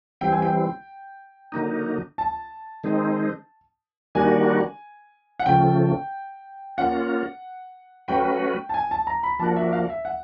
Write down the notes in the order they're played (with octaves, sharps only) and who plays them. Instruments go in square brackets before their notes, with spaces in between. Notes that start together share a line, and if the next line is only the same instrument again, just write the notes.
[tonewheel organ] E3 G3 C4 [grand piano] G5
[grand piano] G#5
G5
[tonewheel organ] D3 F#3 A#3 D#4
[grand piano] A5
[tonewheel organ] D#3 G#3 C4 D#4
[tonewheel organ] D#3 G3 A#3 D4 F#4 [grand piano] G#5
[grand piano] F#5
[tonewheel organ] C#3 F3 A3 [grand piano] G5
[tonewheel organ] A#3 C#4 F4 [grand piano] F#5
[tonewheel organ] F#3 A3 C#4 F#4 B4 [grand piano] G5
[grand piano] A5
G#5
A5
A#5
B5
[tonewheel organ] F3 A#3 D4 F#4 [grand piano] A5
[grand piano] E5
F5
E5
F#5